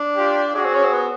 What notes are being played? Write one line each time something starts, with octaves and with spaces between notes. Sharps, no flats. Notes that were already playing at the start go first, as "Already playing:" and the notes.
Already playing: D4
F4 G4
D4 F#4 G#4
C4
C#4
C4
B3